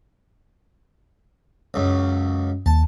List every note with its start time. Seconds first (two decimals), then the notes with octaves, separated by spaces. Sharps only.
1.74 C#2 F#2
2.66 D#2 A5